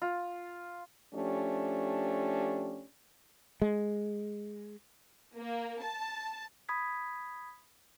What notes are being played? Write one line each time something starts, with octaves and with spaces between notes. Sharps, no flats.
F4
F3 A3 C#4 D4 G4
G#3
A#3
A5
B5 D#6 G#6 B6